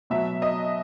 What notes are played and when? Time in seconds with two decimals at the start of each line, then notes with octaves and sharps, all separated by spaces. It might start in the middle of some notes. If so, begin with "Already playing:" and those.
0.10 B2 F#3 E5
0.42 D#5